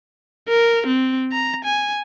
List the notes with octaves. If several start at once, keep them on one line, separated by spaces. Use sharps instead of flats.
A#4
C4
A#5
G#5